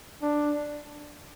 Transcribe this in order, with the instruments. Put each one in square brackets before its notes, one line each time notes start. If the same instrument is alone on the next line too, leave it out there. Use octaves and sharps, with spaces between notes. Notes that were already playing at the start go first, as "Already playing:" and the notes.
[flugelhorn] D4